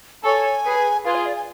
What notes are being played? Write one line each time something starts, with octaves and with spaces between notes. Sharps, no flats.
A4 C#5 G#5
G#4 B4
F4 G#4 B4
F5
D5
G#5